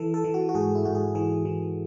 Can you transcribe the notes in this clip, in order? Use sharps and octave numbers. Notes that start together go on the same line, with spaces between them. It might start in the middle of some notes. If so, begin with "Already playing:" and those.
Already playing: E3 A4
A4
E3
F#4
F#4
G#2 G#4
E4
G#2 F#4
G#4
E3 G#4
E3